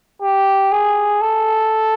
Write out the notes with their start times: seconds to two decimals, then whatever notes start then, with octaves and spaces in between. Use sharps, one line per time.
0.22 G4
0.72 G#4
1.21 A4